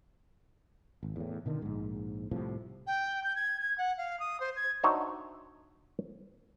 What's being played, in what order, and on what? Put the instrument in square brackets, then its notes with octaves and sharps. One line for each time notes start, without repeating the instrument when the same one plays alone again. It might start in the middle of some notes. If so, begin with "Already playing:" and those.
[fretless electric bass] G#1
E2 A2
B2 D3 D#3
A#1 G#2
C2 A2 C3 F3
[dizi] G5
G6
G#6
G#6
F#5
F5
D#6
C5
G#6
[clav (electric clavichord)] D4 D#4 F#4 C5 C#5 E5